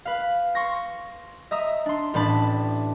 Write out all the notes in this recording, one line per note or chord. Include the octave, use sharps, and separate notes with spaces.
B4 F5
C6 C#6 A#6
D#5 E5 A#5 D#6
D4 C6
A1 A2 C#4 D4 A5 B5